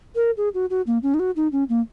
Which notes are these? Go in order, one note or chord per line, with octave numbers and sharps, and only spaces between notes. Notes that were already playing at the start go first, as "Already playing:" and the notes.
A#4
G#4
F#4
F#4
A#3
C#4
D#4
F#4
D#4
C#4
A#3